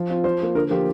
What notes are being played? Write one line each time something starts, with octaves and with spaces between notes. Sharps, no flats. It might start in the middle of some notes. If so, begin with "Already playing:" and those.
Already playing: F3
C4 F4
F3 C5
A#3 F4
D3 A#4
F3 A#3 F4 G4